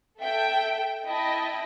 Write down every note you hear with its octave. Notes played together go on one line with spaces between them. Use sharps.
A4 E5 G5
E4 D#5 G5 A5